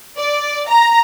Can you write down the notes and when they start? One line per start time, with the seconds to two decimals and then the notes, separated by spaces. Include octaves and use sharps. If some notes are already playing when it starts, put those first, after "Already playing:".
0.17 D5
0.68 A#5